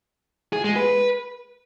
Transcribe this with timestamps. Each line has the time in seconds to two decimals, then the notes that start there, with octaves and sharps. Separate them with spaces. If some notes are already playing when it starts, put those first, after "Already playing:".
0.53 G#4
0.64 G#3
0.76 B4